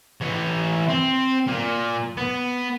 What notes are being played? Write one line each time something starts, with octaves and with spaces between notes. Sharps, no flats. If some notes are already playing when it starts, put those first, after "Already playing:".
E3 C#5
C4
A#2
B3